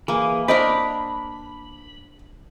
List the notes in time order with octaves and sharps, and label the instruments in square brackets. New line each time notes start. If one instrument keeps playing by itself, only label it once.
[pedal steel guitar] E3 G#4 [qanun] A#3
[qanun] D4 A#4 D5 [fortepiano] C5 D#5 [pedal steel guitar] B5